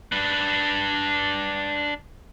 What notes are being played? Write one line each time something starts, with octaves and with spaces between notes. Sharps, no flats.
D4 B4